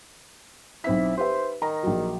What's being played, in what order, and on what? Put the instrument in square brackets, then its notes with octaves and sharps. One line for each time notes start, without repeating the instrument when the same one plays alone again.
[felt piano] B1 C4 B6 [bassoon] E4
[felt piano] G4 B4 E5 [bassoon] C5
[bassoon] D#3 [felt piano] A#5
[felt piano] A#1 F#3